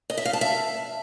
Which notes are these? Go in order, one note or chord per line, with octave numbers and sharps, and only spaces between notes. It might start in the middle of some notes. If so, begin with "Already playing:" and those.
D#5
E5
F5
A5
E5